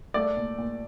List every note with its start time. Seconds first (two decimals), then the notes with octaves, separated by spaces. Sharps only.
0.14 A3 D5
0.37 A#2
0.58 A#2